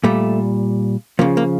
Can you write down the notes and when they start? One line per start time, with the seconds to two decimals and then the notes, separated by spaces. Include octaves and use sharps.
0.04 A#2 G3 A3
1.19 C#3 F3 A#3
1.37 A#3